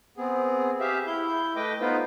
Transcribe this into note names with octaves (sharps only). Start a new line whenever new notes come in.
B3 C4 G#4
G4 G#4 E5 F5
E4 G6
A3 B4 D#5 G5 D6
B3 D#4 F4 B4 C5